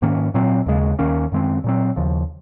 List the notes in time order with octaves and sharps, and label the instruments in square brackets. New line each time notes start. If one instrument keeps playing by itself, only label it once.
[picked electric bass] G#2 D#3 A#3 C#4
A#2 F#3 C4
D#2 C#3 G#3
D#2 D#3 A#3 C#4
F#2 D#3 G#3 C4
A#2 F#3 C4
D#2 C#3 F3